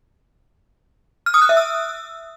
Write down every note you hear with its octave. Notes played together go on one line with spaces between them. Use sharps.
F6
D#6
F#6
E5
E6